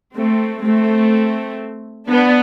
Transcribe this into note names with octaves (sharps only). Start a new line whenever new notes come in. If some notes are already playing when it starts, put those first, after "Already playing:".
A3 C4
A3 C4
B3 D4